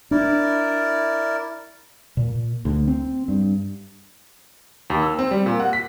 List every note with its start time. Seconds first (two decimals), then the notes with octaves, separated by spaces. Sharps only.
0.11 D4 E4 A#4 D5
2.17 A#2
2.65 D2
2.87 C4
3.28 G2
4.90 D#2
5.03 E6
5.19 C4
5.31 G3
5.46 A#2
5.60 F#5
5.73 B6